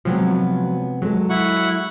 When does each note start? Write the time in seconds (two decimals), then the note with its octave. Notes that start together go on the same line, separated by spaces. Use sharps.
0.05 C3 F3 F#3 G#3 B3
1.02 F#3 G#3 A4
1.30 E4 F#5 C#6